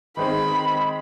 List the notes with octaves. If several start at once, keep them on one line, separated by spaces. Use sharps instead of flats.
D#3 G#3 C4 B5